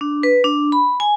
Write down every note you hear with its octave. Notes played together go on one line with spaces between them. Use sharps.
D4
B4
D4
B5
G#5